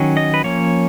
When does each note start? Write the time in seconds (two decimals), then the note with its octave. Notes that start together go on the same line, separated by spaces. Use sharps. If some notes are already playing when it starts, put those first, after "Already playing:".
Already playing: D#3 F#3 C#4
0.17 D#5
0.34 B4
0.44 F3 A#3 C#4 C#5